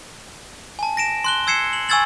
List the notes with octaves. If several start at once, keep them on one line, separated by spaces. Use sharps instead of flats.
G#5 A5
A#6 D7 E7
C6 F#6 G7
E6 G#6 C7 C#7 E7
F#7
G#5 C#6 E6 G#6 A6 F#7